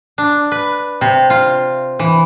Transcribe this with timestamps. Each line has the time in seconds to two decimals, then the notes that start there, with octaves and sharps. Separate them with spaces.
0.18 D4
0.52 B4
1.01 C3
1.30 F4
1.99 E3